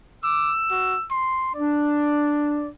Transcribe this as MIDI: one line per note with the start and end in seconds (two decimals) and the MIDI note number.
0.24 0.52 86
0.24 1.05 88
0.71 0.96 66
1.11 1.51 84
1.55 2.69 62
1.55 2.68 74